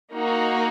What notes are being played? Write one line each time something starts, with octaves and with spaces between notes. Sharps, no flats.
A#3 D#4 F#4